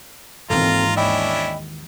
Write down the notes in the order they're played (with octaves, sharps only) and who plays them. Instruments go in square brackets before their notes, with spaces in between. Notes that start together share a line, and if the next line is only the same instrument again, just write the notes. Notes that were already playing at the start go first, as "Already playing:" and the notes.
[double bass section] G#1 D#2 [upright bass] D#3 E3 [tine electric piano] C4 A4 [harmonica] F4 A#5
[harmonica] C#4 D4 E4 [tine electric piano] D#5 G5 B5